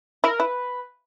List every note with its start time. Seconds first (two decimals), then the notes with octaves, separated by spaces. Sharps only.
0.24 E4 A#4
0.39 E4 B4